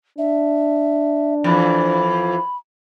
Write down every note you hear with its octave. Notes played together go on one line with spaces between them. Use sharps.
D4 E5
F2 E3 B5